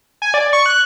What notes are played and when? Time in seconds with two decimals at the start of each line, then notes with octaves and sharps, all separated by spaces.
0.22 G#5
0.34 D5
0.53 C#6
0.66 F#6